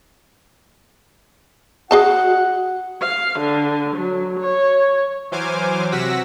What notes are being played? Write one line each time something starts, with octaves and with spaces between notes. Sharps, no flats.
F#4 G#4 D#5 F#5 A5
F5
D3
F#3
C#5
E3 F#3 C5 G#5 D6 F6
C3 F#4 F#5 E6 A#6 B6